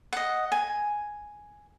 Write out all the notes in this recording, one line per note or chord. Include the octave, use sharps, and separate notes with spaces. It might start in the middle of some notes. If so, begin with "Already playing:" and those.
D#5 F#5
G#5